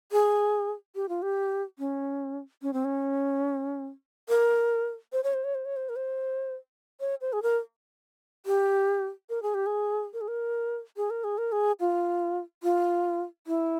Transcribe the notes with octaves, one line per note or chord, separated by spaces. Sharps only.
G#4
G4
F4
G4
C#4
C#4
C4
C#4
A#4
C5
C#5
C5
C#5
C5
C#5
C5
A#4
C5
C#5
C5
G#4
A#4
G4
A#4
G#4
G4
G#4
A#4
G#4
A#4
G#4
A#4
G#4
A#4
G#4
F4
F4
E4